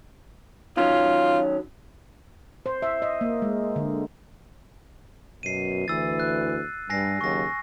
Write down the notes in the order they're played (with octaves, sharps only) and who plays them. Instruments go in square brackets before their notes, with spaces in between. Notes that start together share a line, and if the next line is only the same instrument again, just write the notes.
[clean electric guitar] D#3 F#3 C#4 [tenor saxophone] F4
[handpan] C5
E5
D#5
A#3
G#3
D3
[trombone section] F#2 B2 [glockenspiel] C7 D#7
[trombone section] D2 E3 [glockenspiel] E6 A6
[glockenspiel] F#6
[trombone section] G2 [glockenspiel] G#5 A#6 C7
[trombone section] D#2 C#3 F#3 [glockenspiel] C#6 A#6